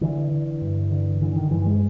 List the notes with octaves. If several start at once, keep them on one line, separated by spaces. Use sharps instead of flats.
D3 E3
D3
G2
D3
D3 E3
D#3
G2 E3
G#3